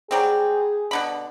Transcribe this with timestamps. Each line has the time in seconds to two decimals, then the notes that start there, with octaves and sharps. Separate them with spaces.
0.11 F#3 G3 C4 G#4
0.91 B2 D3 B5